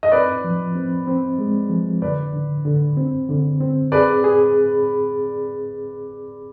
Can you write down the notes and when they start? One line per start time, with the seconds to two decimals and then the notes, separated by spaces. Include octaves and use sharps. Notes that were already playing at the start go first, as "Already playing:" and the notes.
0.03 D#5
0.12 C4 B4 D5
0.44 F3
0.75 C4
1.07 C4
1.38 G#3
1.70 F3
2.02 D3 B4 D5
2.34 D3
2.65 D3
2.97 C4
3.29 D3
3.60 C4
3.92 G#4 B4 D5
4.24 G#4